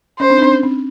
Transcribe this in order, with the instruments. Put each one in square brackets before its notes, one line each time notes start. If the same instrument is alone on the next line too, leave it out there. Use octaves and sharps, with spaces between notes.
[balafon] C#4 [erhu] C5
[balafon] C4 D4
D#4
C4 D4
C#4
C4